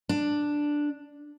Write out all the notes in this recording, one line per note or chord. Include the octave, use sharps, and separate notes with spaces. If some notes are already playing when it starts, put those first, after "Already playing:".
D4